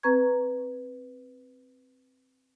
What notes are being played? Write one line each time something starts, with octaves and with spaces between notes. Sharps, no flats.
C4 B4 A#5 C#6 G#6